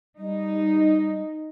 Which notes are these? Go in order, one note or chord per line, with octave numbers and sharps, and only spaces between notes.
G3 D#4